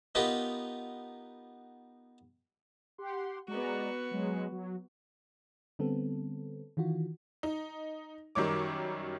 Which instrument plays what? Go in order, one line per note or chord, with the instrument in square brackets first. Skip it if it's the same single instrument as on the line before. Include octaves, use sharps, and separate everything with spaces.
[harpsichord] B3 D#4 F4 G4 A#4 B4
[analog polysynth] G4 F#5 C6
[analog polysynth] G#3 D5 A#5 [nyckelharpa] B3 F#4
[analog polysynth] F#3 G#3
F#3
[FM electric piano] D3 G3 B3 C4 A4
D#3 E3 F4 F#4
[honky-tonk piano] D#4
F#2 D#3 G3 C#5 D6